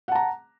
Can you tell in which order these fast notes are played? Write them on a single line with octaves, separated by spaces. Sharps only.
F#5 A5 A#5